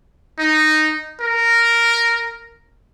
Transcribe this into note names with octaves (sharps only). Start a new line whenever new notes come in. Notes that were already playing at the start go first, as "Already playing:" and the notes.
D#4
A#4